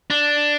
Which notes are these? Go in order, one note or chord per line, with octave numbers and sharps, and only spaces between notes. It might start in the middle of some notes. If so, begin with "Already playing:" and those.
D4